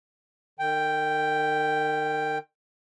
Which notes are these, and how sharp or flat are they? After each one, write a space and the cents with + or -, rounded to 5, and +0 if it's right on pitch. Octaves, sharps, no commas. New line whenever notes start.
D#3 -40 G5 +0